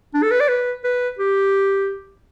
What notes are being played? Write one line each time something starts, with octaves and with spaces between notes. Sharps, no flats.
D4
A4
B4
D5
B4
B4
G4